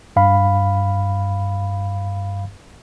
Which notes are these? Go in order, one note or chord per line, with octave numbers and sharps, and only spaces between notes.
G2 F5 B5